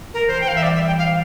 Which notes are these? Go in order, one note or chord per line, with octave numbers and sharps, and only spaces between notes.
A#4
E3 C5
G5
F5
E5
G3 D5
E5
G5
F5